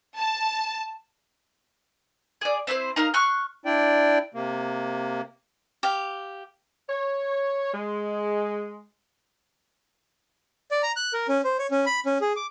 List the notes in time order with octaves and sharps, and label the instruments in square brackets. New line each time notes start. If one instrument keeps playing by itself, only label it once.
[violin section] A5
[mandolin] G#4 D5
C4 E4 B4 C5
D#4 A#4 F5 A#5
C6 C#6 F6 F#6
[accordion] D4 E4 D5 G5
C3 A#3
[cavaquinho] G4 F5
[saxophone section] C#5
G#3
[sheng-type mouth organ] D5
A#5
F#6
A#4
C#4
C5
C#5
C#4
B5
C#4
G#4
D6